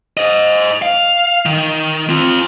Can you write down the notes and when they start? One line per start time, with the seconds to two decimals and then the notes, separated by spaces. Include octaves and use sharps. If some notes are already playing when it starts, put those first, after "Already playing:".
0.17 C5 D#5
0.82 F5
1.46 D#3
2.09 C4 F4